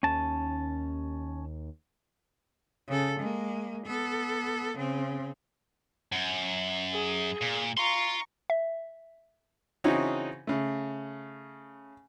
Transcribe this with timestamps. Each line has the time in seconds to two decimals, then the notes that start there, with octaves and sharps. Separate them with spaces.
0.03 D#2 C#4 A5
2.88 C#3 A4
3.19 G#3 A#3
3.86 B3 A4
4.77 C#3 C4
6.12 F#2
6.93 G#4
7.41 A#2
7.77 F5 A#5 C6 C#6
8.50 E5
9.84 C#3 E3 C4 C#4 D#4 F#4
10.47 C#3 A3